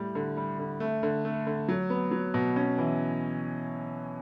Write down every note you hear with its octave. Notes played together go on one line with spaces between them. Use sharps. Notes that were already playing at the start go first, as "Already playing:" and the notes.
Already playing: A2 G3
D3
G3
D3
A3
D3
A3
D3
F#3
B3
F#3
B2
C#4
E3